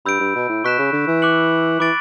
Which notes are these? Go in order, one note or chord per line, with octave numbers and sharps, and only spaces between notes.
G2 B5 E6 G6 D7
G2
B2
A2
B2 C#6 F#6 B6 E7
C#3
D3
E3
D6 F#6 C#7 F#7
E3 B5 D6 A6 D7 F#7